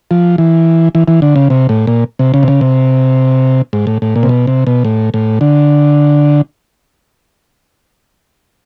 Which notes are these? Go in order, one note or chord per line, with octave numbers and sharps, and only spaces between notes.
F3
E3
E3
E3
D3
C#3
C3
A2
A#2
C3
C#3
C3
C#3
C3
G#2
A2
A2
A#2
C3
B2
C3
B2
A2
A2
D3